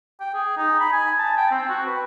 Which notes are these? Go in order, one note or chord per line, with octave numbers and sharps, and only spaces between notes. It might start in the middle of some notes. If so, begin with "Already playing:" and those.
G5
G#4
D#4
B5
G#5
A5
G5
C4
F#4
B4